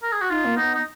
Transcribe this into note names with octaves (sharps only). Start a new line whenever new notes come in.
A#4
G#4
F#4
D#4 F4
A#3
B3 D#4
D#4